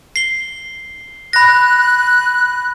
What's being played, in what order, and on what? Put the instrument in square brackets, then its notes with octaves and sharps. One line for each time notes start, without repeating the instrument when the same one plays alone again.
[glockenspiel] C7 G7
[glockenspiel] B5 A#6 [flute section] F#6